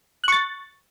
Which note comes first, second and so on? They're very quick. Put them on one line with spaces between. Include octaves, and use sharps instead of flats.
F#6 C#6 A6